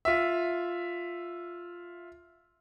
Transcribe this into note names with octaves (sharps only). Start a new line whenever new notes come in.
F4 E5